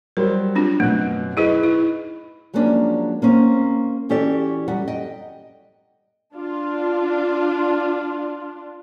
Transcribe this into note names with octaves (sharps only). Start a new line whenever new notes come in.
F#3 G3 A#4 C5
C4 D4 F4
F#2 B2 A3 F#6
D#4 E4 G#4 B4 D#5 B5
E4
F3 F#3 G#3 A#3 C#4 D4
A#3 C4 C#4
E3 C#4 F#4 G4 A4 D5
F#2 G3 F#5
D#5 G5
D4 F4